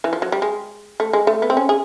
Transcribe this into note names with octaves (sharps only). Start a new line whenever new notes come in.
E3
F3
F#3
G3
G#3
A3
G#3
A3
B3
C4
C#4
G#4